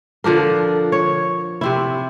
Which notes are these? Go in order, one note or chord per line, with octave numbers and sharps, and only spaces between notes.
D3 F3 D4 A#4
C#5
C3 C4 E4